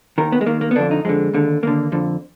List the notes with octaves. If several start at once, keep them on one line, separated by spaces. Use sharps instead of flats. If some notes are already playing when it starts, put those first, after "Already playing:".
D#2 D#3 A#4
B3
G#3
D#2 D#3 A#3
A#3
B3
F2 D3 D4
D#4
F2 D3 G#3
D#2 D3
D#2 D3 A#3
F2 D3